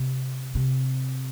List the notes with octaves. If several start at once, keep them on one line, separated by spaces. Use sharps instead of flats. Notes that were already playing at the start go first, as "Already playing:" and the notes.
Already playing: C3
C3